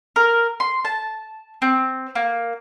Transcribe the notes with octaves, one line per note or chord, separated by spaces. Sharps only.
A#4
C6
A5
C4
A#3